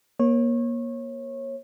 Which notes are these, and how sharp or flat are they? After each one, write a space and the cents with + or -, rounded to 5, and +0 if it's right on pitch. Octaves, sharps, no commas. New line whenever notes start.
A#3 +30 C#5 -25